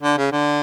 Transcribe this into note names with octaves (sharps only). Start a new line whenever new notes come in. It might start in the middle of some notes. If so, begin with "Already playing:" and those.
D3
C#3
D3